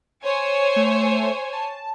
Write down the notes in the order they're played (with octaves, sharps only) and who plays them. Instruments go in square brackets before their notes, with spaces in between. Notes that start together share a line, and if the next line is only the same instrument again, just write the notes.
[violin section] C5 C#5 G#5
[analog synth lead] A3
A5